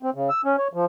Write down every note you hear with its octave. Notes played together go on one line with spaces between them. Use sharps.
C4
C#3
E6
C#4
C#5
F3